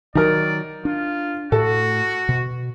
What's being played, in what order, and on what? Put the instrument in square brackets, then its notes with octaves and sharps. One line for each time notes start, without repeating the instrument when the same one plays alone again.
[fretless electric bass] D#3 E3 F#3 [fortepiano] D#4 A#4 [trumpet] D5
[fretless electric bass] D4 [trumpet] F4
[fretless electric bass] A2 [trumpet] F#4 [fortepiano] A4
[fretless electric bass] B2